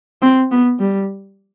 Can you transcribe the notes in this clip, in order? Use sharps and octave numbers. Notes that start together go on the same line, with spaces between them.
C4
B3
G3